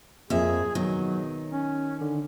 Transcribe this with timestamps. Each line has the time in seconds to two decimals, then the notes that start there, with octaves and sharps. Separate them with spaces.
0.30 F2 A#2 G#4 E5
0.75 B2 D#3 F#3
1.52 C#4
2.01 D3